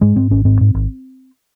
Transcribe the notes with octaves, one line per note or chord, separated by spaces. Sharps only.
G#2 G#3
G#2 C4
G#1 C#4
G#2 C4
G#2
G#1